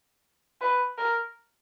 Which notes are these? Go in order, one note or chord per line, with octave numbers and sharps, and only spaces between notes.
B4
A#4